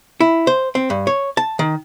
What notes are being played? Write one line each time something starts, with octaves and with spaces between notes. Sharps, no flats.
E4
C5
C4
G2
C#5
A5
D#3